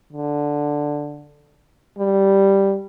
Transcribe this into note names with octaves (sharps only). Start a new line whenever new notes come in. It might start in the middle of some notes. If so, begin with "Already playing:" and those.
D3
G3